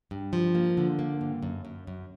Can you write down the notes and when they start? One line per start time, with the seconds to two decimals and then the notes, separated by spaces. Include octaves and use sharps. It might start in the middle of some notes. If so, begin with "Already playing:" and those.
0.11 G2
0.33 F3
0.55 A#3
0.77 D3
0.99 A#3
1.21 G2
1.42 F#2
1.65 F#2
1.87 F#2